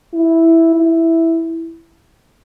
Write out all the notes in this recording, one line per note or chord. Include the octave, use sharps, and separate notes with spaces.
E4
E4